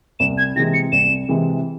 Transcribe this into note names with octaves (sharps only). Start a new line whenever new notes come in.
C2 E7
G#6
C3 E3 G#3 A#6
C#7
C2 E7
C3 E3 G#3